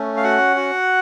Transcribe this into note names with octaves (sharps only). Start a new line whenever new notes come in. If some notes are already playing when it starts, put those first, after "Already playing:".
Already playing: A3 C#4
F5
F#4 F#5
F#4